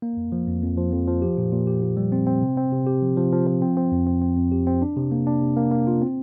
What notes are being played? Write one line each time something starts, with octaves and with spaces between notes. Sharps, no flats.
A#3
F2
F3
F2
F2
F3
F2
F3
G4
A#2
A#2
G4
A#2
G3
C4
C4
C3
C4
C3
G4
F3
F3
F3
F3
C4
C4
F2
C4
C4
F2
G4
C4
D4
C3
A#3
D4
C3
A#3
A#3
F4
C4